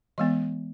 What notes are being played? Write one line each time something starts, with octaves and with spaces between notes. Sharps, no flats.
E3 G#3 B3 D#5